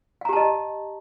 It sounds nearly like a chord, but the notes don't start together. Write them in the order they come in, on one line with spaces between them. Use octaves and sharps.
F5 A#5 G4 A5 D#5